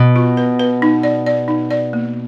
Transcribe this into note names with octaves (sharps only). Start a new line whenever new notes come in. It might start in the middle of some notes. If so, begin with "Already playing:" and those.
Already playing: B2
F4
B4
B4
D#4
D5
D5
D#4
D5
A#3